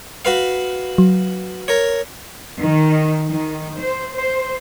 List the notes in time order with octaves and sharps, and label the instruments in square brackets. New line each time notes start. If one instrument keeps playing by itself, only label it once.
[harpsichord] F#4 B4 F5
[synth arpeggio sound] F#3
[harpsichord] A#4 C#5
[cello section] D#3
D#3
C5
C5